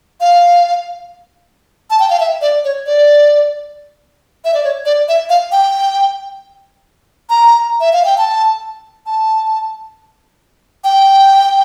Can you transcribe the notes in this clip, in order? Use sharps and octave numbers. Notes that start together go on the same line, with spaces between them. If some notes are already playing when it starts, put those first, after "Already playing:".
F5
A5
G5
F5
E5
D5
C#5
D5
E5
D5
C#5
D5
E5
F5
G5
A#5
E5
F5
G5
A5
A5
G5